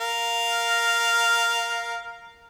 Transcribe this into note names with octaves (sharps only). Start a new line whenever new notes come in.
A#4 F5